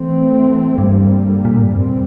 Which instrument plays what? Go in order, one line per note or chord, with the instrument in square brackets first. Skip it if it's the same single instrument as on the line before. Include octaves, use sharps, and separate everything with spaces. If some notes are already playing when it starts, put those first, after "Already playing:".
Already playing: [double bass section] E3 A3 C4
[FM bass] G2 [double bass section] D3 G3 A#3
[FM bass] A#2
A2
G2
[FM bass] F2 [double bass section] C3 E3 G3 C4